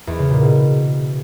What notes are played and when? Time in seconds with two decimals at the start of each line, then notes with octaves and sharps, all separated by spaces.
0.07 E2
0.19 C#3
0.30 A#2
0.42 B2